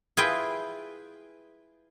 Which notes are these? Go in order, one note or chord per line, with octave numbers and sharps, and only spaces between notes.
E4 F4 G#4 B4 G5